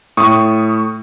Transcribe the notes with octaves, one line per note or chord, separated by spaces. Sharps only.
A2 C#6 D#6